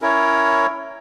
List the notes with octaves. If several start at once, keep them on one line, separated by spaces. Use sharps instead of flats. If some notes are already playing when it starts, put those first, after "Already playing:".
C#4 E4 A#4 C#5